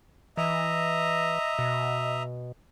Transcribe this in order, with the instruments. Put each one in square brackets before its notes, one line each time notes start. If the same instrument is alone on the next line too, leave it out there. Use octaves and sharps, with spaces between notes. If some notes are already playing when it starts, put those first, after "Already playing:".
[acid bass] E3 [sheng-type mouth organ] D#5 E5 A#5
[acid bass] B2